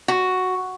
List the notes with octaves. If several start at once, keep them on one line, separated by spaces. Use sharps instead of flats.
F#4